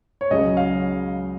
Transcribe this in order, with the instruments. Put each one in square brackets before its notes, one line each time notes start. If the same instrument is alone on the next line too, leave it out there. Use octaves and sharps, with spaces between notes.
[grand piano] C#5
C#2 C#3 F#3 D#5
F5